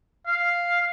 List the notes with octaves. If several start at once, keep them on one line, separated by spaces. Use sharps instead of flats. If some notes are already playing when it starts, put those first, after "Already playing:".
F5